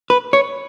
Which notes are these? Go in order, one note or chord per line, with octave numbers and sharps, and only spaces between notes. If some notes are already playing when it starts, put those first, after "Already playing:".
B4
C#5